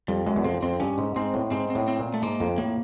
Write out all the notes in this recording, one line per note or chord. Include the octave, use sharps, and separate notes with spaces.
F2 G3
F#2 G#3
E2
F2 C4
F2 C4
G2 C#4
G#2
G#2 C4
A2
G#2 C4
C4
A2
C4
A#2
A3
G#2 A#3
F2
A2 A#3